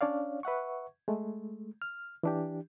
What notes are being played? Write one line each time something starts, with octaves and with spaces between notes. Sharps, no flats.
C#4 D4 C#5 D5 F5
B4 E5 F#5 C#6
G#3 A3
F6
E3 D4 G4